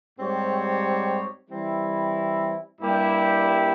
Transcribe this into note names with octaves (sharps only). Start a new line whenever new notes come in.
G#2 G3 C4 G4 C#5
E3 G3 C4 E4
G2 G3 A#3 E4 G4